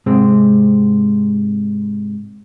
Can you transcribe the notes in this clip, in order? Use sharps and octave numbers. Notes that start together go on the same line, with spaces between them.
G#2 C3 G#3 C4